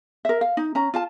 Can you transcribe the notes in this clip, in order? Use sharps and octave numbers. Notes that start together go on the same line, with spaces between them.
A#4 E5
F5
D#4
C#4 A#5
F4 F5 A5